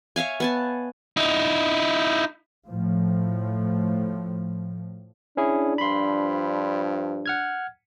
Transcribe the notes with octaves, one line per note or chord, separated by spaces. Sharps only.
C#5 E5 F5 G#5
B3 G#5 A5
D#4 E4
A2 F3
C#4 D4 E4 G#4
G2 F3 B5 C6
F#5 F6 G#6